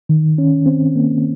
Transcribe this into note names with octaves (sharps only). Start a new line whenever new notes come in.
D#3
C#4
C4
A#3